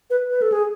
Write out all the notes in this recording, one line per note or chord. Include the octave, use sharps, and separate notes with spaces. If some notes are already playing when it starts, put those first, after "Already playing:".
B4
B4
A4
G#4